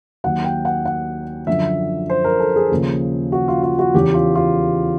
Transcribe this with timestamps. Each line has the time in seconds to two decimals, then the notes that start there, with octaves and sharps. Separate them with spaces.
0.24 D#2 D#3 F#3 F#5
0.44 G5
0.65 F#5
0.85 F#5
1.47 F#2 D3 F3 E5
2.10 C5
2.24 A#4
2.40 A4
2.56 G#4
2.71 D#2 C#3 F3
3.32 F#4
3.48 F4
3.63 F4
3.79 F#4
3.94 E2 C#3 E3 G4
4.14 F4
4.35 F4